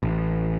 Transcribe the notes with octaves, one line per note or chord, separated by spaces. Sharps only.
A1